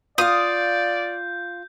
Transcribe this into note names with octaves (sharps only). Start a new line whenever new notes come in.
F4 D5 F5 D#6 G6